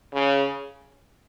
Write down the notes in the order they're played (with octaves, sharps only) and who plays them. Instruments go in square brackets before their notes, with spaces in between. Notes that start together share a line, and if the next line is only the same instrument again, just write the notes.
[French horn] C#3